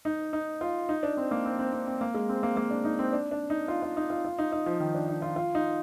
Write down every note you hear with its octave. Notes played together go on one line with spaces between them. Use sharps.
D#4
D#4
F4
D#4
D4
C4
A#3
C4
C4
C4
C4
A#3
G#3
C4
A#3
A#3
D4
D#4
C4
D4
D4
D#4
F4
F4
D#4
F4
F4
D#4
D#4
F3
D#3
D4
D#4
F4
F4
D#4